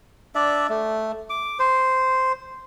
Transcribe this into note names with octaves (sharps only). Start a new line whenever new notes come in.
D4 D5 E5
A3
D6
C5